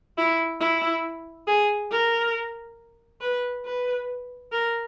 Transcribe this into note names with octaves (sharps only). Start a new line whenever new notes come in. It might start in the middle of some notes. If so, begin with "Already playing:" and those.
E4
E4
G#4
A#4
B4
B4
A#4